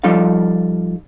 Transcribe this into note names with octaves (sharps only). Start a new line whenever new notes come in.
F3 G3 D#4 F4 A4 F5